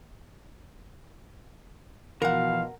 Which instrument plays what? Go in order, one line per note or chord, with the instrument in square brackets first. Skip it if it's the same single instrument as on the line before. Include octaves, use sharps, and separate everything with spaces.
[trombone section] B2 [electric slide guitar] E3 F3 [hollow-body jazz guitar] A#4 F#5 [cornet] F5